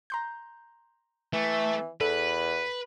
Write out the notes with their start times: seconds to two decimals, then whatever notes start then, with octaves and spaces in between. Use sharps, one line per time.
0.10 A#5 C6 G6
1.33 E3 A3
2.01 E2 A4 B4